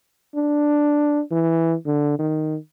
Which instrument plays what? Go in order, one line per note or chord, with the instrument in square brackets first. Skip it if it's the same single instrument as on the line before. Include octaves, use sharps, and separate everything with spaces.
[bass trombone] D4
E3
D3
D#3